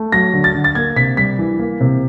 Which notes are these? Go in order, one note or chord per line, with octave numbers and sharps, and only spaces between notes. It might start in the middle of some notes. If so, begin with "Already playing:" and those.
Already playing: A3
F#3 A#6
D3
A6
D3
A6
A#3 G#6
C3 B6
G3 B6
E3
A#3
C3